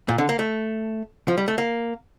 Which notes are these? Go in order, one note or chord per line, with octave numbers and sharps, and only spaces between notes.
A#2
D3
A#3
A3
F3
G3
A3
A#3